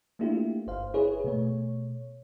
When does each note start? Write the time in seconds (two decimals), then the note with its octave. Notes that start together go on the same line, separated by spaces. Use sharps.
0.19 A3 A#3 D4 E4 F4 G4
0.67 G1 C5 F5
0.94 E4 G#4 B4 C#5
1.24 B2 A3 C#5